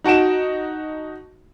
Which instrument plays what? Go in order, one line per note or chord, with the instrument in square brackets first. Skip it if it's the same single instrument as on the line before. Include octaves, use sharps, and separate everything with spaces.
[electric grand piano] D#4 F#4 A5 D7 E7